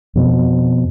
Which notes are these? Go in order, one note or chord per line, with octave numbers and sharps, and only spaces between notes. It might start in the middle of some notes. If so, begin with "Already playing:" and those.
F2 B2